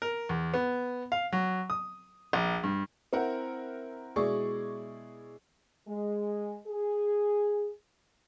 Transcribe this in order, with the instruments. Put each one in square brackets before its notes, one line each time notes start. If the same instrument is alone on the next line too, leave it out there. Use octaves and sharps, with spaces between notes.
[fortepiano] A#4
E2
B3
F5
F#3
D#6
A#1
G2
[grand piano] C4 E4 A#4 F#5
B2 G#3 E4 G#4 D5 C#6
[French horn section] G#3
G#4